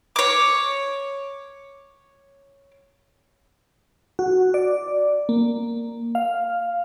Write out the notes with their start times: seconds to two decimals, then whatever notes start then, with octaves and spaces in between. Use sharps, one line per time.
0.16 C#5 D6
4.19 F#4
4.54 D5
5.29 A#3
6.15 F5